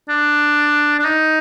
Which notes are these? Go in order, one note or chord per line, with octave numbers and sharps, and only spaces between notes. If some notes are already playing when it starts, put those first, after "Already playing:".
D4
D4
D#4